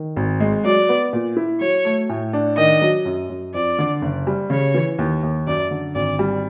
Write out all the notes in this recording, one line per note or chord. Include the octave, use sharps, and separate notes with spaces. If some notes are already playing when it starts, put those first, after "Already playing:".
Already playing: D#3
G#1
G#3
F#3 D5
B3
A#2
E4
F#3 C#5
A3
A2
D4
D#3 D#5
F#3
F#2
F#2
F2 D5
D3
F#1
G3
C#3 C#5
E3
D#2
D#2
F#2 D5
D3
G#1 D5
G3